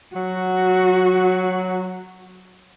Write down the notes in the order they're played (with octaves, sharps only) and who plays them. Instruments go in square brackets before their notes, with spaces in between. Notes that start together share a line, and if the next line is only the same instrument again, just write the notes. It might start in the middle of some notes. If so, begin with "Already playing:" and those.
[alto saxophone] F#3 [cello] F#4